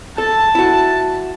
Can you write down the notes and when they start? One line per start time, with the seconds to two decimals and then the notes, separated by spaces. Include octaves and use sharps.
0.18 A4 A5
0.55 E4 F#4